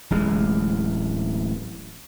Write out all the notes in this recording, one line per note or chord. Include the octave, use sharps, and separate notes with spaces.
D1 A1 G#3